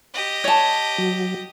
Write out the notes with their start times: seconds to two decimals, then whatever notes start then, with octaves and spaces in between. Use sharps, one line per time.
0.14 G4 D#5
0.44 C#5 A5
0.98 F#3